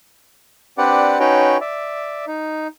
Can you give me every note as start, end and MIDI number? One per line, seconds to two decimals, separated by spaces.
0.78 1.19 60
0.78 1.19 62
0.78 1.19 67
0.78 1.19 71
0.78 1.19 74
0.78 1.19 78
1.20 1.57 61
1.20 1.57 63
1.20 1.57 66
1.20 1.57 71
1.20 1.57 73
1.20 1.57 79
1.61 2.25 74
1.61 2.25 76
2.27 2.67 63